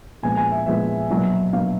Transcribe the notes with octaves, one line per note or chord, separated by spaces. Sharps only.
A#2 F3 G#3 B3 G#5
G#5
E5
A#2 F3 G#3 B3 E5
B2 F#3 A#3
B2 F#3 A#3 F5